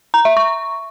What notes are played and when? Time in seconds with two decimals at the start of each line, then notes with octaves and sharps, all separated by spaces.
0.14 A#5
0.25 E5
0.37 C#6